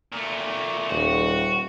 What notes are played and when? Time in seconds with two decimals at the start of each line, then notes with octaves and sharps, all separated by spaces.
0.12 A#2 A3
0.90 D#1 F#4